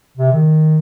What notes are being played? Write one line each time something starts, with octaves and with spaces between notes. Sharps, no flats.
C3
D#3